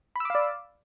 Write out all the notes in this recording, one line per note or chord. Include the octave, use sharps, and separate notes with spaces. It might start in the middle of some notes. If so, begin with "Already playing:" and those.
D5 F5 B5 D6 E6